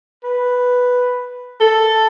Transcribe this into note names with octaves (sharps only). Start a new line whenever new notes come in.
B4
A4